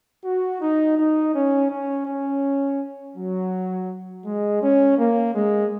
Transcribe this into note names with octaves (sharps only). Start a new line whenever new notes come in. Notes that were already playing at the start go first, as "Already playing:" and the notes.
F#4
D#4
D#4
C#4
C#4
C#4
F#3
G#3
C#4
A#3
G#3